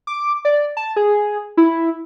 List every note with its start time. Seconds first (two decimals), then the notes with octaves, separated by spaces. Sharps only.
0.07 D6
0.45 D5
0.77 A5
0.96 G#4
1.57 E4